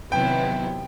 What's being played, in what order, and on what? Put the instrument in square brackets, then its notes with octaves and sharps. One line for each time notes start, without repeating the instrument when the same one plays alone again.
[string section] C3 D#3 F#3 B3 E4 [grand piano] G5